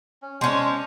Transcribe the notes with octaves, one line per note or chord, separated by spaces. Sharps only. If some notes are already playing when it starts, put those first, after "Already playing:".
C#4
G#3 C#4 D4 C5